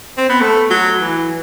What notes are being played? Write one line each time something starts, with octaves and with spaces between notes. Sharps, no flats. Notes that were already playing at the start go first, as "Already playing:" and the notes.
C4
B3
A3
F#3
E3